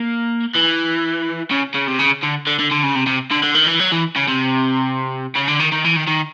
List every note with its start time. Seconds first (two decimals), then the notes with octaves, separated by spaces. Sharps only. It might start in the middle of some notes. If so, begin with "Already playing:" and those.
Already playing: A#3
0.56 E3
1.51 C#3
1.75 C#3
1.88 C3
2.00 C#3
2.23 D3
2.47 D3
2.59 D3
2.71 D3
2.83 C#3
2.95 C3
3.07 C3
3.31 D3
3.44 D3
3.55 D#3
3.67 E3
3.80 F#3
3.92 E3
4.16 C#3
4.28 C3
5.35 C#3
5.48 D3
5.59 D#3
5.72 D#3
5.84 E3
5.96 D#3
6.07 D#3